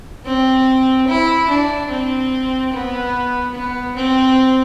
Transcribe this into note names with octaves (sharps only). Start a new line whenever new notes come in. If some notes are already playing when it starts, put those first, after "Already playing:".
C4
E4
D4
C4
B3
B3
C4